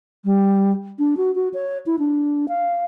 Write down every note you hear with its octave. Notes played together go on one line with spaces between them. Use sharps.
G3
D4
F#4
F#4
C#5
E4
D4
F5